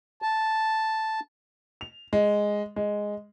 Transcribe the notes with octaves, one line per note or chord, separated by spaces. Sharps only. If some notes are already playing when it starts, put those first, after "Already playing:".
A5
F7
G#3
G#3